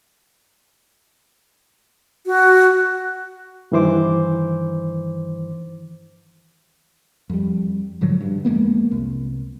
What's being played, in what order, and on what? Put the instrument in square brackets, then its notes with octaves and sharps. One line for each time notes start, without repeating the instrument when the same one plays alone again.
[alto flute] F#4
[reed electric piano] G2 D#3 E3 C5 D6
[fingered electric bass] F2 G3
G#2 D3 F3 F#3
G2
F2 G#3 A#3 B3
C2